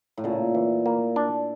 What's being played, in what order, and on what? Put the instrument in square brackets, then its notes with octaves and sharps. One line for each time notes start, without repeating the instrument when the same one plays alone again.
[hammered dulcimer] A2
[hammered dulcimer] A#2 [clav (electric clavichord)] C#3
[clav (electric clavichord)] E3
A#3
D4